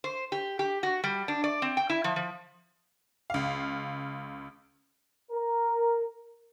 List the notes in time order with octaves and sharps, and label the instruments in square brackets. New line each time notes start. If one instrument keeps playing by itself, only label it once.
[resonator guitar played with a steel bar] C5
G4
G4
F#4
G3
D4
D5
C4
G5
E4
F3
F3
[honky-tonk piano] C#2 F5
[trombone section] A#4